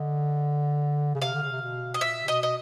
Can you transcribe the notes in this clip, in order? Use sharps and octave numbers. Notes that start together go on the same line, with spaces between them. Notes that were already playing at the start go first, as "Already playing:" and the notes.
Already playing: D3 D#5
C#3
C3 F5
D3
C#3
C3
B2
D#5
A#2 E5
C3
B2 D#5
D#5